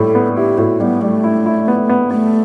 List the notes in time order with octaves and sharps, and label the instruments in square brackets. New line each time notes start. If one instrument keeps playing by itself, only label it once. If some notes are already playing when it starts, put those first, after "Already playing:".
Already playing: [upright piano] A2 G3 [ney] A4
[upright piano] B3
[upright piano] E4 [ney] G4
[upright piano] A2 [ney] F#4
[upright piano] G3 [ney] B3
[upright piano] G3 [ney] A3
[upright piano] E4
E4
B3
B3
[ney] A3 [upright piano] B3